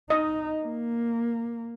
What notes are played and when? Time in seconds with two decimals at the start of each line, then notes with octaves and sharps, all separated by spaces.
0.10 D#4 D#5
0.63 A#3